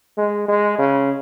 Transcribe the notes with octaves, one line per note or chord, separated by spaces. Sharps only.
G#3
G#3
C#3